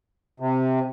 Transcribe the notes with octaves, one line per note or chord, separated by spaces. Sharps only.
C3